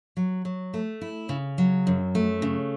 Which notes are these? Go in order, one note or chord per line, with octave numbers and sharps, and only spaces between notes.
F#3
F#3
A3
E4
C#3
F#3
F#2
A3
C#3